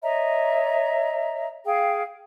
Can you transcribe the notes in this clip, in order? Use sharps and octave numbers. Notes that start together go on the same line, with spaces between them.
C#5 D#5 E5 A#5
G#4 F5 G5